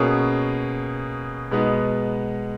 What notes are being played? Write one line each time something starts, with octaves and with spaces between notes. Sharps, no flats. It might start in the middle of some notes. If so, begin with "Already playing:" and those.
Already playing: B2 A#3 C#4 G#4
B2 G#3 B3 D#4